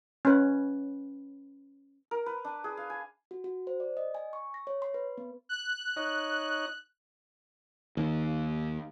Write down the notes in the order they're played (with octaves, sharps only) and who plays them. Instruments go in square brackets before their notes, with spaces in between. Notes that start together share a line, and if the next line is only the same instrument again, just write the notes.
[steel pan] C#4 B4
[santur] A#4
B4
D4
G#4
F5
G#5
[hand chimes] F#4
F#4
C5
D5
D#5
G#5
C#6
A#6
C#5
C6
B4
B3
[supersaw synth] F#6
[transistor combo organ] D#4 C#5 D#5
[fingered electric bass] D#2